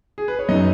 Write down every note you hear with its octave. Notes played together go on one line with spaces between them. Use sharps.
G#4
B4
C#5
F#2 F#3 B3 D#4 D#5